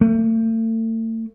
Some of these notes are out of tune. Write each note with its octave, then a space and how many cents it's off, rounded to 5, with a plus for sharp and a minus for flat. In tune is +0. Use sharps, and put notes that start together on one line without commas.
A3 +40